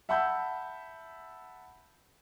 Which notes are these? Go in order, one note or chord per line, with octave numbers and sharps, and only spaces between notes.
E5 F#5 A5 B5 E6 G6